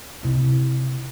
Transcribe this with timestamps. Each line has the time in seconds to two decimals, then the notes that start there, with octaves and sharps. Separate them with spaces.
0.23 C3 E4